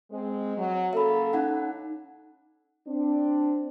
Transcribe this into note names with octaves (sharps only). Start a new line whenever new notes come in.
G#3 C4
F#3
C#3 A#3 A4 E5 B5
C#4 D#4 F#5
C4 D4